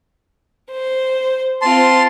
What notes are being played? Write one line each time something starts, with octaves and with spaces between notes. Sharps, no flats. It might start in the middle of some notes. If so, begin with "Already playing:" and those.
C5
C4 F4 A5 C6